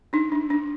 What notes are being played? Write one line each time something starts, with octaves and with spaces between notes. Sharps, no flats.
D4 D#4
D4
D4